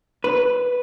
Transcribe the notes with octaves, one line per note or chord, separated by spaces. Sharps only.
B4